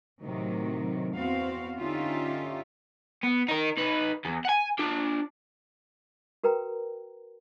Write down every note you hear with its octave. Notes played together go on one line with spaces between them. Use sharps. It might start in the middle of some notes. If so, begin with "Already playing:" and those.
A2 C3 D#3 F#3
E2 B3 C4 F#4 C5 F5
D3 C#4 D#4 F4 G4 E5
B3
D#4 A#4
D#4 B4
E2
F#5 G#5
D4 F4
F#4 A#4 B4 G5 A#5